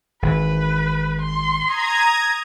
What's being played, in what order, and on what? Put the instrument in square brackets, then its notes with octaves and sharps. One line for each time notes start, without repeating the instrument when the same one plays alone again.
[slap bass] G#1 E3 [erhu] B4
[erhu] C6
[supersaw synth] A#5 D#6 G#6